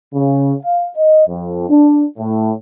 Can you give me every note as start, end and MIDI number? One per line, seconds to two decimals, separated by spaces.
0.14 0.53 49
0.63 0.88 77
0.96 1.25 75
1.27 1.66 41
1.69 2.04 62
2.18 2.52 45